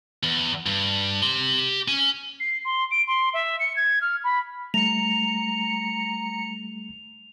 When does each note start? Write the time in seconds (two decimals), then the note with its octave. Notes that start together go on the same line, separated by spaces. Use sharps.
0.23 E2
0.66 G2
1.22 G4 C6
1.88 C#4 G#5
2.40 C7
2.65 C6
2.91 D7
3.07 C6
3.33 E5
3.59 C#7
3.76 G#6
4.01 F6
4.24 B5
4.74 G3 A3 A#5 C#7 F7